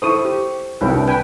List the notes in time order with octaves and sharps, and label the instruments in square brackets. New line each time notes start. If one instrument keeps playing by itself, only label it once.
[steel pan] E4 A4 D#6 [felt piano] C5 C#6 D#7
[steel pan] G4
[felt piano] C2 C3 [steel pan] B4 C#5 G5
[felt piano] D4
[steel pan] B4 G5 G#5